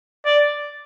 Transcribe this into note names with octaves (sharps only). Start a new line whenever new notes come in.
D5